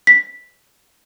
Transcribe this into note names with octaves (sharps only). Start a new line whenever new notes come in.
B6